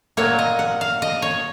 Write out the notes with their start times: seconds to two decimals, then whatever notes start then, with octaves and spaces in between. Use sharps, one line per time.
0.17 A#2 F#3 A#3 C#5
0.39 D#5
0.59 F#5
0.81 F5
1.02 D#5
1.22 C#5